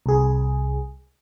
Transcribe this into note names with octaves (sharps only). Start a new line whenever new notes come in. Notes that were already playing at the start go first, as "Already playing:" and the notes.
C2 G#4